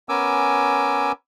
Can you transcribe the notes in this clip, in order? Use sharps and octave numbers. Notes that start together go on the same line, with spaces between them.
B3 C#4 A#4 G#5 D6 E6